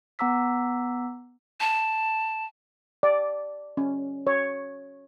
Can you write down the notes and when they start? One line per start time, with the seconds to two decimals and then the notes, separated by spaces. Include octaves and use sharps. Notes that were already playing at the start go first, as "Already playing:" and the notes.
0.19 B3 F#5 A#5 D6 E6 B6
1.60 A5
3.03 D5
3.77 C#4
4.27 C#5